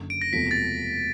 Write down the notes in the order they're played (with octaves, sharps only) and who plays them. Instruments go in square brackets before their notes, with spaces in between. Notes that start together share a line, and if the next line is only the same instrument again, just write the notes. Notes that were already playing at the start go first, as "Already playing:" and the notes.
Already playing: [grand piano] F#1 F#2 D3
[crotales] D7
A#6
[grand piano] E1 E2 C3 F3 A3 [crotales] B6
[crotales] A6
A#6